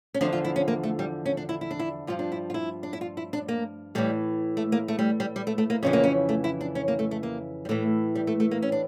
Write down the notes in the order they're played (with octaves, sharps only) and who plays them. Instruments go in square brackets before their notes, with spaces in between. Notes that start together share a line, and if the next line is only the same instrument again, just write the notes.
[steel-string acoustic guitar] C#4
E2 D3 F3 D4
F4
E4
C#4
A#3
A3
G3
C#4
D4
E4
E4
D4
E4
G2 F3 F4
D4
E4
F4
E4
D4
E4
F4
E4
D4
A#3
A2 E3 G3
A3
A#3
A3
G3
G3
G3
A3
A3
A#3
F2 C#3 E3 C#4
A#3
C#4
A3
E4
D4
C#4
A#3
A3
A3
A#3
G3
A2 E3 A3
G3
A3
A3
A#3
C#4
D4